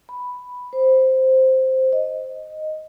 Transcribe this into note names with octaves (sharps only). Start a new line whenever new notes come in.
B5
C5
D#5